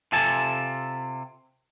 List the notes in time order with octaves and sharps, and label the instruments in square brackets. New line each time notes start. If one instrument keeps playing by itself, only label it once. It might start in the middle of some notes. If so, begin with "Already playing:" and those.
[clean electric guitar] C3 F4 A4 G#5 A5